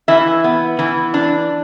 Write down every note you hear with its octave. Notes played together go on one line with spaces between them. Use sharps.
E3 E5
B3
E3
D4